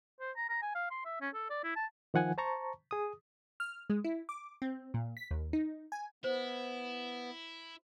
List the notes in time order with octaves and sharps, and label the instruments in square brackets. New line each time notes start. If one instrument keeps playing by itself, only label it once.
[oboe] C5
A#5
A#5
G#5
F5
C6
E5
C#4
A4
D5
E4
A5
[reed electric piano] D#3 F3 F#5 G#5
C5 A5 A#5 C#6
G#4 D#6
[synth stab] F6
G#3
E4
D6
C4
A#2
B6
D#2
D#4
G#5
[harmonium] B3 [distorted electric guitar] E4 [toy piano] C5